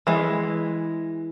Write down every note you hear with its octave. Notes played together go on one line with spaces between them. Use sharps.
E3 G#3